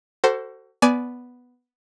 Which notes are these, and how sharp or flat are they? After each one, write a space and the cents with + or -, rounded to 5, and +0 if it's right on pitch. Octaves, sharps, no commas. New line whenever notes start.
F#4 +30 A4 +30 C5 +5
B3 +0 D5 -10 G#5 +15